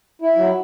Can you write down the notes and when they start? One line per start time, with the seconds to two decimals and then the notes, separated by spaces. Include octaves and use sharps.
0.22 E4
0.36 F#3